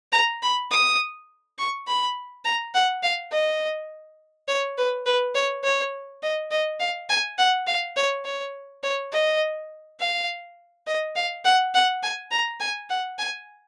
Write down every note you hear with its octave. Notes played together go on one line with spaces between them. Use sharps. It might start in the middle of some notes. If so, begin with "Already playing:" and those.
A#5
B5
D#6
C#6
B5
A#5
F#5
F5
D#5
C#5
B4
B4
C#5
C#5
D#5
D#5
F5
G#5
F#5
F5
C#5
C#5
C#5
D#5
F5
D#5
F5
F#5
F#5
G#5
A#5
G#5
F#5
G#5